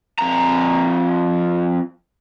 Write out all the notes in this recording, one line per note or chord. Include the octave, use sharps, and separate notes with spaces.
F2 A#5